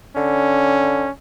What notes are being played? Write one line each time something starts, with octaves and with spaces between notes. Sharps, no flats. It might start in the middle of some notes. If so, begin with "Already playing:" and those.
D3 C#4